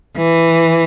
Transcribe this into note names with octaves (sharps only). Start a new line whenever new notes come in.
E3